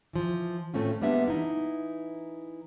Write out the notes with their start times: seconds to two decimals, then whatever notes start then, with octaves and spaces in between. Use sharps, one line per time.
0.13 E3 F3
0.74 A2 A3 C4 C#4 F4
1.01 G3 G#3 A#3 B3 D4 E5
1.28 E3 D#4 E4